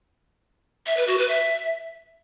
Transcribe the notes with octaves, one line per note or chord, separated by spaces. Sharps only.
E5
B4
F#4
B4
E5